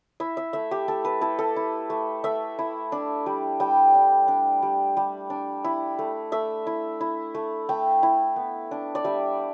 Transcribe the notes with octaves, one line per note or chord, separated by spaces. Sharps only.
E4 E5
E5
A3 E5
G4
A3 A4
B4
E4 A4
A4
E4
A3
A3 E5
E4
D4
G3
G3 G5
D4
D4
G3
G3
D4
E4
A3
A3 E5
E4
E4
A3
A3 G5
E4
B3
D4
D5
G3 E5